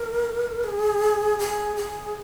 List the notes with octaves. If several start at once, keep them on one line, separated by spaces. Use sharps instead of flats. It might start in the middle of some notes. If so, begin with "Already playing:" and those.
Already playing: A#4
G#4
G#4
G#4